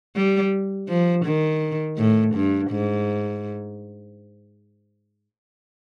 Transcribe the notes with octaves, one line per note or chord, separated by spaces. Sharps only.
G3
F3
D#3
A2
G2
G#2